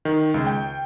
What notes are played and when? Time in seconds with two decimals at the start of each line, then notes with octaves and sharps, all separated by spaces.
0.05 D#3
0.34 C#2
0.47 G5